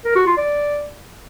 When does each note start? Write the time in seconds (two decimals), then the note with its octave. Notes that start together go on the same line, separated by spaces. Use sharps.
0.05 A#4
0.16 F#4
0.26 F4
0.37 D5